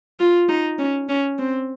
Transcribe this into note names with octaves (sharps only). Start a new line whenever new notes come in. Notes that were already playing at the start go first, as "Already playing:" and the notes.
F4
D#4
C#4
C#4
C4